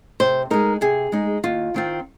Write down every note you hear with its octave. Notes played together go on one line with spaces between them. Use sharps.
C3 C5
G#3 D#4 A#4
C3 G#4
G#3 D#4
D#2 F4
D#3 C4 F4